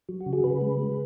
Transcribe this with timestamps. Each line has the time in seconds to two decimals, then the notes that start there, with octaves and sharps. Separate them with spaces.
0.09 F#3
0.21 F#4
0.26 C#3
0.33 G#4
0.44 C#3 B4
0.61 G#3
0.79 G#3